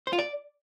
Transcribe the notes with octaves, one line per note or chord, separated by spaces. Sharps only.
C5
F4
D5